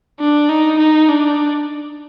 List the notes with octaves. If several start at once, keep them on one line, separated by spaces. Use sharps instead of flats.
D4
D#4
D#4
D4